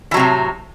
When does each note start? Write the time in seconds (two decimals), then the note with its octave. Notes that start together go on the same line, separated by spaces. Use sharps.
0.11 E3
0.14 F#3
0.17 C3
0.19 A2